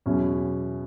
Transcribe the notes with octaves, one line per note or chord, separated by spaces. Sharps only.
E2 B2 F#3 C#4 E4